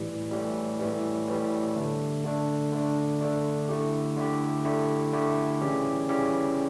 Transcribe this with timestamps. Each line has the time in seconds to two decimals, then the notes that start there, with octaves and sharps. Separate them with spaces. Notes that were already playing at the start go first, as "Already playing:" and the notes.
Already playing: A2 E3 G3
0.31 A2 E3 G3
0.80 A2 E3 G3
1.28 A2 E3 G3
1.76 D3 A3 D4
2.25 D3 A3 D4
2.72 D3 A3 D4
3.21 D3 A3 D4
3.68 D3 A3 E4 G4
4.17 D3 A3 E4 G4
4.65 D3 A3 E4 G4
5.13 D3 A3 E4 G4
5.61 C#3 E3 G3 C#4 G4
6.09 C#3 E3 G3 C#4 G4